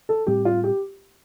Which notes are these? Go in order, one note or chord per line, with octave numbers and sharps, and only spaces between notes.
A4
A2 G3 C4 G4
F4
G4